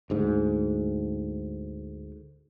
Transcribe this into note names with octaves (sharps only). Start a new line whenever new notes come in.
D2 G#2